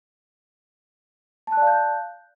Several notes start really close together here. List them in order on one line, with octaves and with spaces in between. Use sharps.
A5 F#6 D5 F5 G6